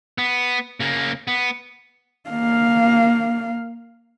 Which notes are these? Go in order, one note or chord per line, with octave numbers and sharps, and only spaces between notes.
B3
C#3 A#3
B3
A#3 F5